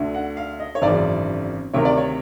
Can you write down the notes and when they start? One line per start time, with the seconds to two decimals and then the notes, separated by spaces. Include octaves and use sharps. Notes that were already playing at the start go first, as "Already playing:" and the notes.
Already playing: D2 D3
0.14 F#5
0.37 F5
0.60 D#5
0.75 C#5
0.82 G#1 F#2 C#3 E3 D5
1.74 D2 C3 D#3 C#5
1.85 D5
1.97 C#5